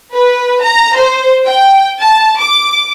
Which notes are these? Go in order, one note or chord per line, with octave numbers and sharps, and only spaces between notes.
B4
A#5
C5
G5
A5
D6